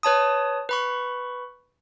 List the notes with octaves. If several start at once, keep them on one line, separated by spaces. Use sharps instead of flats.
B4 C#5 A5 D#6
B4 B5 C#6